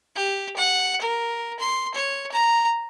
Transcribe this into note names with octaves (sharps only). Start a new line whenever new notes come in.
G4
F#5
A#4
C6
C#5
A#5